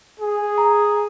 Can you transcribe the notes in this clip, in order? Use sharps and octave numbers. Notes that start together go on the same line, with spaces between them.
G#4
A#5